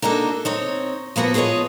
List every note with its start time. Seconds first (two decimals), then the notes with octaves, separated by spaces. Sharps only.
0.02 A#3 D4 D#4 F#4 A4
0.45 C4 D#4 C#5
1.16 F3 A#3 B3 F#4 B4
1.34 F4 G#4 A4 B4 C#5 D#5